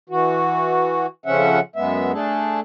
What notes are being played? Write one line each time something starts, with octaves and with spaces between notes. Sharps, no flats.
E3 F#4
F2 C#3 F3 C#4 E5 F#5
F#2 G#3 B3 E5
A3 D4 G#4 A4